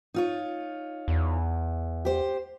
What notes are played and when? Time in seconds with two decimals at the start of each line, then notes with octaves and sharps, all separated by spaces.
0.14 D#4 F4 C#5
1.08 E2
2.05 G4 C5